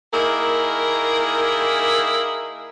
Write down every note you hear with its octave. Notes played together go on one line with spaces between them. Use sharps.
D#3 A#3 E4 G#4 A#4